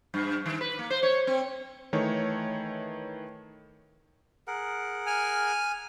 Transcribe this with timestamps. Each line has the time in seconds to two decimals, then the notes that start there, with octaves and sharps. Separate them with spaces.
0.14 G2
0.46 D#3
0.61 B4
0.79 A#3
0.90 C5
1.03 C#5
1.27 C4
1.93 D#3 E3 A3 C#5
4.47 G#4 A#4 F#5
5.07 G#5 F6